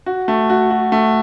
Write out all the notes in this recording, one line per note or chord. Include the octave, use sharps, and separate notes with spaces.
F#4
A3
F#4
F#4
A3